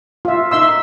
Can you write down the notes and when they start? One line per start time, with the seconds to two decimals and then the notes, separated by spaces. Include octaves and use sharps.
0.25 F4 E5
0.51 D#4 E5 C6 E6